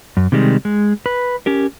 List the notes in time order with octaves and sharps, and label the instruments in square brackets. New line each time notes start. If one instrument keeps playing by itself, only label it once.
[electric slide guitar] F#2
C3 D#3 G3 G#3
G#3
B4
C#4 G4 A#4